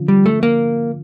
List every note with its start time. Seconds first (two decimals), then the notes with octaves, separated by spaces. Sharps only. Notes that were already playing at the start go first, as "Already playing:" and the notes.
Already playing: D3 F3 C#4 F4
0.08 G3
0.26 A3
0.43 A#3